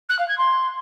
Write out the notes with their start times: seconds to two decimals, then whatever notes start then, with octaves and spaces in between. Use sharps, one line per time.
0.09 F#6
0.19 F5
0.28 G#6
0.38 C6